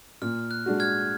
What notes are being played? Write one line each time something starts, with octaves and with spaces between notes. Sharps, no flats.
A#2 F6
F#6
G#3 D4 F#4
F6 G#6